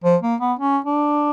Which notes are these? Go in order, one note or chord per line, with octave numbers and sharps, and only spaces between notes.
F3
A#3
B3
C#4
D4